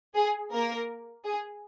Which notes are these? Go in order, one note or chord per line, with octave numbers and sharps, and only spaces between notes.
G#4
A#3 A#4
G#4